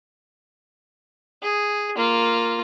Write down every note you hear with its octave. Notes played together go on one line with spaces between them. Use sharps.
G#4
A#3 F4